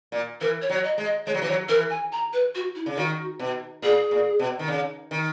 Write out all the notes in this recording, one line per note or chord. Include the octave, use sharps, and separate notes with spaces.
A#2
E3 A#4
C#5
F#3
C#5
D#5
G#3
D#5
G#3 C#5
F#3
E3
F#3 C#5
E3 A#4
G#5
A#5
B4
F#4
E4
C#3
D#3 F#4
B2
A#2 G#4
A#2
B2
D#3
C#3
D#3